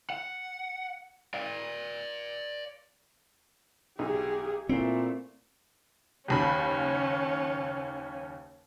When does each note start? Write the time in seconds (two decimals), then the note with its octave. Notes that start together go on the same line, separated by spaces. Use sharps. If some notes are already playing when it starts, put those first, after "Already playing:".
0.10 F#5
1.34 D5 F5
3.99 B1 D#4 G4 G#4
4.69 A#2 A3 C4 E4
6.28 F#1 D#2 C#4 B5